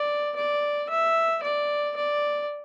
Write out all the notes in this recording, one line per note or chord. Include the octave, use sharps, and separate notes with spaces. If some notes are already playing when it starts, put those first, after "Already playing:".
Already playing: D5
D5
E5
D5
D5